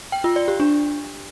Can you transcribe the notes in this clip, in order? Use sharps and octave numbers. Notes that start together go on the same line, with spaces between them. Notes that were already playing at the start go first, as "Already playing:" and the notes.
G5
F4
D5
G4
D4